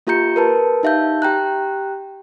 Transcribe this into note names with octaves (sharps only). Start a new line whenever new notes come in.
A#3 F4 G4 A#5 G6 C#7
A#4 B4 A5
D#4 G4 E5 F5 A5 G6
G4 G5 A#5 F#6